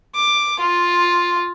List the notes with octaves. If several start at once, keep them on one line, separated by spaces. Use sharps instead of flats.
D6
F4